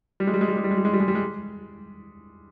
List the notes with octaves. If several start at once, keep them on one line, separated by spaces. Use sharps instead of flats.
G3
G#3
G3
G#3
G3
G#3
G3
G#3
G3
G#3
G3
G#3
G3
G#3